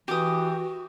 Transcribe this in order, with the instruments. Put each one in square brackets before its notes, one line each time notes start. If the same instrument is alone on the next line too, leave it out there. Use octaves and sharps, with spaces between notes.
[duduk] E3 [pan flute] F#4 [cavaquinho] G4 D#6